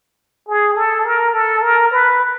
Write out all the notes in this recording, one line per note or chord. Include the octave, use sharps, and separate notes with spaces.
G#4
A4
A#4
A4
A#4
B4